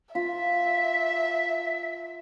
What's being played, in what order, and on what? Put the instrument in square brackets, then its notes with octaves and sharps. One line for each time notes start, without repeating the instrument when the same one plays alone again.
[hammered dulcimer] F4 [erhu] E5 [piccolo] B6